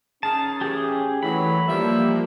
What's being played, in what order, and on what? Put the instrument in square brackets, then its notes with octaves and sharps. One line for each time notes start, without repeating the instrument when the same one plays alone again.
[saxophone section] D#3 G#4 [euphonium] C#4 [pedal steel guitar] A5
[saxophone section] A2 E3 [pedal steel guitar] G4 G#4
[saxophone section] A#2 F#3 [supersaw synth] E3 [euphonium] A3 [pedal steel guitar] B5
[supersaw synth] F3 A#3 [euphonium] G3 [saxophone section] B3 G4 E5